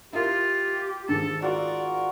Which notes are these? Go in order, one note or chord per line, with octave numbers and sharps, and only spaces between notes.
E4 F4 G4 A#4
G#2 D#3 A4
F4 F#4 A#4 D5